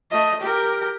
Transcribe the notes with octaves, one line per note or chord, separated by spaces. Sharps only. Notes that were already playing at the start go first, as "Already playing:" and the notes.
A3 D#5
G4 A#4